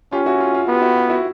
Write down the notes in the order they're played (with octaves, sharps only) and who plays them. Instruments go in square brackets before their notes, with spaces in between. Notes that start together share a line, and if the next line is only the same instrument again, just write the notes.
[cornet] C#4 [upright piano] F4 G4
[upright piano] E4 F#4
F4
F4
[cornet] B3 [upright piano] F4 G4
[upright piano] E4 F#4
F4
E4 F#4